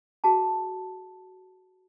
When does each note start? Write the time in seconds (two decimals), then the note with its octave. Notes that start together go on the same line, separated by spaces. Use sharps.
0.24 F#4 G#4 A5